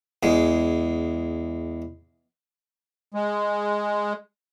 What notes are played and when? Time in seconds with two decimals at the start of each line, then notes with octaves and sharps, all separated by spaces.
0.23 E2 G#3
3.14 G#3